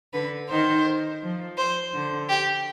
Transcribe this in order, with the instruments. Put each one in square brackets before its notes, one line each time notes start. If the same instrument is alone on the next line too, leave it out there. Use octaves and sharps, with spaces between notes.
[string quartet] D3 [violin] B4
[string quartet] D#3 [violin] C5
[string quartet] F3
[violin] C5
[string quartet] D3
[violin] G4